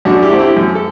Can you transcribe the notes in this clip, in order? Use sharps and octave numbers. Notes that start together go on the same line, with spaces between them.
F#2 D4 F#4
E4 G4
D3 A3 C4
E4 G4
F#2
A4